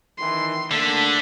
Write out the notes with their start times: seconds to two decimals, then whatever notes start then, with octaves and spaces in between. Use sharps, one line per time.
0.18 D#3 E3 C6
0.71 D3 A3 A#3 D4 B6